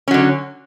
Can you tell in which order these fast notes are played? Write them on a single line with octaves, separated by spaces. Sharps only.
C#4 F#3 D3